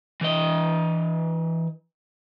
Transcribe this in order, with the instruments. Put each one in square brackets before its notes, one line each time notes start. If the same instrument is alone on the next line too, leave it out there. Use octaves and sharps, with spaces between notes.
[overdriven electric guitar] E3 D#5